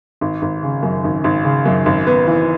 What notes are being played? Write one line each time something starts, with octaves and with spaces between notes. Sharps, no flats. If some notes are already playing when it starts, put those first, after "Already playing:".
G#1
G#1
C#3
F#2
G#1
G#1
C#3
F#2
G#1
B3
E3